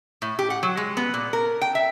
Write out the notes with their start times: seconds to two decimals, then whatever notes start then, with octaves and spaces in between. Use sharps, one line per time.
0.22 A2
0.39 G4
0.50 F#5
0.63 F#3
0.77 G#3
0.97 B3
1.14 A#2
1.33 A#4
1.62 G5
1.75 E5